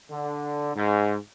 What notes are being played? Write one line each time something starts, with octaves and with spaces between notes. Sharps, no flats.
D3
G#2